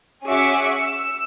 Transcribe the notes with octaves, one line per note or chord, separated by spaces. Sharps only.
C#4 F#4 G#4 E5 D6 C#7
E6